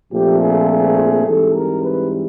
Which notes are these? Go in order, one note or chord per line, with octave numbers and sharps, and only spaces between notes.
A#1 A#2 F3 A3 C4 G4
G#4
G#4
G#2 E3 G3 C4 A4
A#4
B4